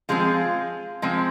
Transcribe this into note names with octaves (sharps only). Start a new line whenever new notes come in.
F3 G#3 C4 F4 G#4
F3 G#3 C4